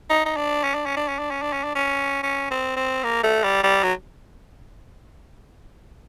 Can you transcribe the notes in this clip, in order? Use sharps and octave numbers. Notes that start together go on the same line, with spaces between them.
D#4
D#4
D4
C#4
D4
C#4
D4
C#4
D4
C#4
D4
C#4
D4
C#4
C#4
C4
C4
A#3
A3
G3
G3
F#3